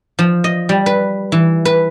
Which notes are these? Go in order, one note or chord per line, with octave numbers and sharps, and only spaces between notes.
F3
D#5
G3
B4
E3
B4